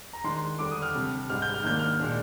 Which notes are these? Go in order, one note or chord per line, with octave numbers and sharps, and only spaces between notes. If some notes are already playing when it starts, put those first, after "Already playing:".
A#5
D#3 G#3 D4 C6
D3 G3 D4 D6
D#6
F6
C3 G3 D4
G#2 G3 D4 F6
G6
F6
D#3 A#3 D4 G6
F6
A#2 G#3 D4